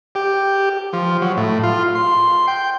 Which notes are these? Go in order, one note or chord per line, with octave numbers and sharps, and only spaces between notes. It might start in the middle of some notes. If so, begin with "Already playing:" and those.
G4
F3
F#3
A2
F4
C6
G5